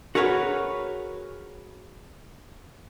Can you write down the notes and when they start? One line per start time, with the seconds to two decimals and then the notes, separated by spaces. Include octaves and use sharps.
0.15 F#4 G#4 A#4 B4 C#5 F#5